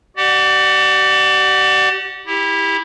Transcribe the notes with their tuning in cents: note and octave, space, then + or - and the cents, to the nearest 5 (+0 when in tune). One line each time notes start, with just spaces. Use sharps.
G4 -35 D5 +20 F#5 +0
E4 -15 G4 +15